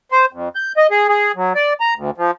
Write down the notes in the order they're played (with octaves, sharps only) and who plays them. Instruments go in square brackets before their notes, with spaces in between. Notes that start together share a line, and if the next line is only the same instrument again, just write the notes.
[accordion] C5
F2
G6
D#5
G#4
G#4
F#3
D5
A#5
D2
F3